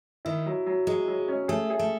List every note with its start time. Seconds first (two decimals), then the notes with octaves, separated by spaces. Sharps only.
0.25 D#3 E4
0.46 F#3
0.66 F#3
0.87 F#3 G#3
1.08 F#3
1.28 C#4
1.48 A3 G#4
1.70 G#4
1.79 A3